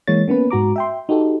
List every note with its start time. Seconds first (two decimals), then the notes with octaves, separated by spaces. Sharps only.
0.07 E3 G#3 A#3 C#5 A6
0.28 A#3 B3 C#4 B4
0.51 G#2 F#4 A#5 D6
0.76 E5 G5 C6
1.09 D#4 F#4 G4 A4